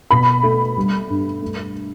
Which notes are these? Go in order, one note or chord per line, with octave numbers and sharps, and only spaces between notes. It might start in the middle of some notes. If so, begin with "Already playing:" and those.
B2 B5
A3
G3
G2
A3